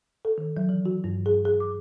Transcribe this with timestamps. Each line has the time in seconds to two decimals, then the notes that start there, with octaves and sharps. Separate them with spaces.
0.25 A4
0.38 D#3
0.57 F#3
0.69 E3
0.86 F#4
1.04 G2
1.26 G#4
1.45 G#4
1.60 D6